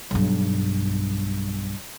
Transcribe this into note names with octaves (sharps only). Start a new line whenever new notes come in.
B1 G2